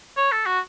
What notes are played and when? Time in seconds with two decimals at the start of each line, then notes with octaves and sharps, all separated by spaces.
0.17 C#5
0.32 A4
0.46 F#4